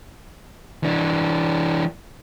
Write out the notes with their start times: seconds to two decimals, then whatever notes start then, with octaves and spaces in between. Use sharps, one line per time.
0.84 E3 D4